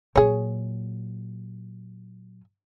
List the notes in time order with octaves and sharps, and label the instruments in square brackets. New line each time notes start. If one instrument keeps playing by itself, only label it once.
[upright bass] A#2 F#3 [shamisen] G#4 C#5